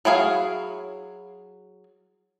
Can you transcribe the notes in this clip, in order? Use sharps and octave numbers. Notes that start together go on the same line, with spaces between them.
F#3 E4 G#4 F5